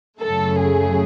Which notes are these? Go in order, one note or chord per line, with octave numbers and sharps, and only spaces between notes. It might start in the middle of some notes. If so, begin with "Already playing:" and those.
F#2 C#3 F#3 A3 A4
G#4